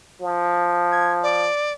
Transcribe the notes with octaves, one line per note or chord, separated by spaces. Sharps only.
F3
G#6
D5